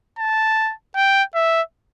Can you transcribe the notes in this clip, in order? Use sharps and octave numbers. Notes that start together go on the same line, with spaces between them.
A5
G5
E5